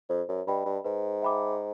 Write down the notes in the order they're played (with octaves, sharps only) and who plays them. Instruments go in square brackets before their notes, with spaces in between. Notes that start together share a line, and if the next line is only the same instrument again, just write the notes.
[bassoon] F2 [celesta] C5
[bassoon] F#2
[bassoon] G2 [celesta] D#5 G5 B5
[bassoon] G2
[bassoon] G#2 [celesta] B4
[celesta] E5 G5 B5 D6